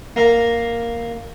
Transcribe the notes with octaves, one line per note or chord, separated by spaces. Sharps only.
A#3 A#4 F5 A#5